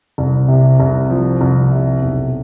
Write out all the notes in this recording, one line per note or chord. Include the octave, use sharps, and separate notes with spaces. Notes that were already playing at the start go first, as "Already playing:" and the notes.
C2
C3
C2
F3
C2
C3
B1